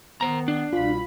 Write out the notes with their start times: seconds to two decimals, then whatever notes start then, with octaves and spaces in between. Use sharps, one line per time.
0.21 D#3 B3 C5 A#5
0.48 D4
0.73 C2 B2 F4 B5